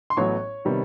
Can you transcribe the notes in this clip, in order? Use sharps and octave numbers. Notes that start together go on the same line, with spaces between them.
C6
A1 A2 F#3 B3 C#5 C#6
C3 D#3 G3 B3